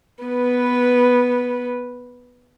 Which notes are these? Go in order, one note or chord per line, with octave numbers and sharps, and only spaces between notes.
B3 B4